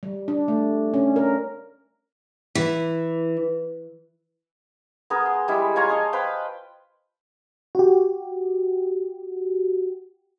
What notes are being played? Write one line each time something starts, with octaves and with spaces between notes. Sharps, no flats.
G3
D4
A3
C#4
A#4
E3
B3 G#4 A#4
C6
G3 G#3 E4
F4 C#5 G#5 A#5
D#5 G#5 A5
B4 C5 F5 G5
F#4 G4